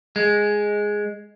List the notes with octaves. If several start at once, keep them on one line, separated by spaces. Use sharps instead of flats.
G#3